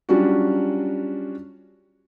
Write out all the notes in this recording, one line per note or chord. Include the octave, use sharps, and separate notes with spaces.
F#3 G3 C#4 D4 F4 F#4